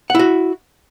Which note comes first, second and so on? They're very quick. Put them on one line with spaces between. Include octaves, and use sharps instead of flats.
F#5 E4 F#4